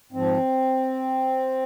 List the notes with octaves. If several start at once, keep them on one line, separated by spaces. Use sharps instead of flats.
G#2 F3 C4